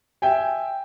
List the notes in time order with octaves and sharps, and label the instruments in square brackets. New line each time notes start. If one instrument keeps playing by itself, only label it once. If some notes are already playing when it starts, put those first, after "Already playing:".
[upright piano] E5 G5 G#5